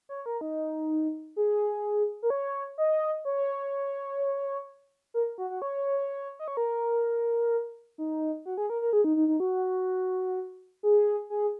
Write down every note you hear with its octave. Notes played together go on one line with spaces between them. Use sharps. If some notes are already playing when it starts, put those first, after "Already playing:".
C#5
A#4
D#4
G#4
A#4
C#5
D#5
C#5
A#4
F#4
F#4
C#5
D#5
C#5
A#4
D#4
F#4
G#4
A#4
A#4
G#4
D#4
D#4
D#4
F#4
G#4
G#4